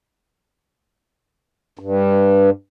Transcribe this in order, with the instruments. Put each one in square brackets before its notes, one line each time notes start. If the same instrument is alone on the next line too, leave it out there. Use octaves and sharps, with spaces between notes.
[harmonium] G2